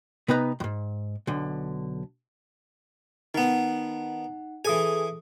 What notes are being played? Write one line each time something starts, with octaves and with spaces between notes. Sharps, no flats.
C3 B3 D#4 B4 A#5
E2 G#2
B1 D3
D#3 B3 D#4 F#5
E3 G#4 A4 G#5 D#6